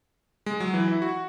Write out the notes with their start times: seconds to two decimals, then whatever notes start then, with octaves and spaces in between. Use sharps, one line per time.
0.46 G#3
0.60 F#3
0.74 E3
0.88 E4
1.02 F#4